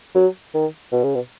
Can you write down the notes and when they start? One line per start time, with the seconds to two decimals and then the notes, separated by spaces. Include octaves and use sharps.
0.15 F#3
0.54 D#3
0.92 B2
1.03 C#3
1.15 B2